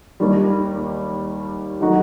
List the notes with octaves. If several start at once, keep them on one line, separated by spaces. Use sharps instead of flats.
D#2 D#3 G3
D#3 F#3 A3 D#4 F#4